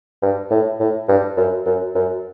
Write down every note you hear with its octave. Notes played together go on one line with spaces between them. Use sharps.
G2
A2
A2
G2
F#2
F#2
F#2